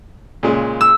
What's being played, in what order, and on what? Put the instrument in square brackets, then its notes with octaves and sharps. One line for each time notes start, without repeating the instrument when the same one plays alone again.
[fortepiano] A#2 C#3 G#3
[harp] E6